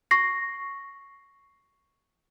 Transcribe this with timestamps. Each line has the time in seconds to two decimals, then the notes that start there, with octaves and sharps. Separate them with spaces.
0.11 C#6 A#6 C7